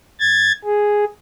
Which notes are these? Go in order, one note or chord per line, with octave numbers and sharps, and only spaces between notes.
G#6 A6
G#4